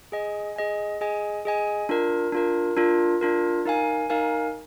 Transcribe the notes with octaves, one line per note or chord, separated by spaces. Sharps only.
G#4 D#5 G#5
G#4 D#5 G#5
G#4 D#5 G#5
G#4 D#5 G#5
D4 F4 A#4
D4 F4 A#4
D4 F4 A#4
D4 F4 A#4
D#4 A#4 F5 G#5
D#4 A#4 F5 G#5